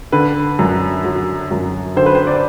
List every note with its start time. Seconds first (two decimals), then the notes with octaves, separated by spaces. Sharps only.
0.12 D3 B4
0.59 F#2
1.04 F#3
1.51 F#2
1.96 D3 C5
2.06 B4
2.15 C5
2.27 D5